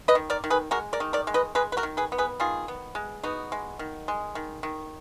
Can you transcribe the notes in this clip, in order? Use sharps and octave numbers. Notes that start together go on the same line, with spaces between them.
B4 D#5
D#3
A#4 D5
D#3
G#4 B4
G#3 F#4 A#4
A#4 D5
D#3
A#4 D5
G#3
B4 D#5
G#3 G#4 B4
B4
F#4 A#4
D#3
G#4 B4
B3
G#4 B4
D#3 F4 G#4
B3
G#3
B3 D#4 F#4
G#3
D#3
G#3
D#3
D#3